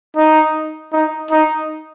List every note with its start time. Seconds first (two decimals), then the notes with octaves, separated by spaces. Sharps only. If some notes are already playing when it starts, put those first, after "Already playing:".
0.16 D#4
0.93 D#4
1.31 D#4